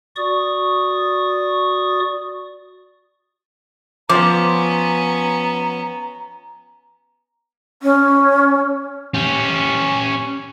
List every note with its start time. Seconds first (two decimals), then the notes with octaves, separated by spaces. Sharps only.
0.16 F#4 D5 C#6 D#6
4.09 F3 B3 C#4 C5 A#5 D6
7.83 C#4
9.14 C#4 G4